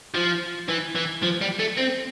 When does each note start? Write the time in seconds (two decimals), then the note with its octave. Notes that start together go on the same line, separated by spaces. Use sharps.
0.15 F3
0.69 E3
0.95 E3
1.23 F3
1.42 G3
1.59 A3
1.77 C4